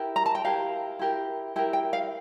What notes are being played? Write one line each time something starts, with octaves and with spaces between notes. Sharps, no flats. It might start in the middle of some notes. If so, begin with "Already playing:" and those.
Already playing: E4 G4 A#4
A#5
A5
G5
E4 G4 A#4 F5
E4 G4 A#4
E4 G4 A#4 G5
G5
F5